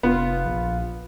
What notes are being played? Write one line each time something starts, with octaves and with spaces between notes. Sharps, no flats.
F1 B3 F4
A#1